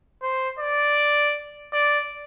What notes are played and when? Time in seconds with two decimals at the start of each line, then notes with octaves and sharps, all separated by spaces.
0.22 C5
0.60 D5
1.73 D5